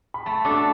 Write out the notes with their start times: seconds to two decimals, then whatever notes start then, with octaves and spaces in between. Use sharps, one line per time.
0.14 B5
0.26 A3 A5
0.45 D4 F#4 A4
0.50 A5